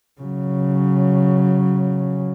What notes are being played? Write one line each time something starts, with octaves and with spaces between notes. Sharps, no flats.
C#3 F#3